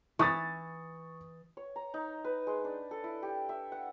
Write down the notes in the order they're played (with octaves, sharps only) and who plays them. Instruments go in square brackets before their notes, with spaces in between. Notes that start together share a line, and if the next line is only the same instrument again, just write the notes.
[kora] E3 [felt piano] C#6 D#6 A6
[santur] C#5
A#5
D#4
B4
G#3
D4
A4
E4
G4
E5
F#5